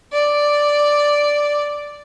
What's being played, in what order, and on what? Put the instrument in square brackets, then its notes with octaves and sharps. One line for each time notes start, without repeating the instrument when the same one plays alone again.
[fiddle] D5